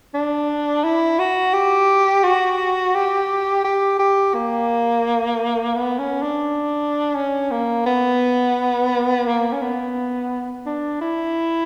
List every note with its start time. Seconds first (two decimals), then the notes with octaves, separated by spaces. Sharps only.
0.14 D4
0.84 E4
1.19 F#4
1.54 G4
2.24 F#4
2.95 G4
3.64 G4
3.99 G4
4.34 A#3
5.76 B3
5.99 C#4
6.22 D4
7.15 C#4
7.51 A#3
7.86 B3
9.27 A#3
9.53 C#4
9.62 B3
10.66 D4
11.01 E4